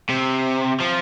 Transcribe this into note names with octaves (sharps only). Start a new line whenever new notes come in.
C3
F3